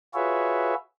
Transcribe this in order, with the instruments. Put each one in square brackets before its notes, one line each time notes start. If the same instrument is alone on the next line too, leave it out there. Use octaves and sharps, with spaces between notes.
[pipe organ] F4 F#4 G#4 B4 C#5 E5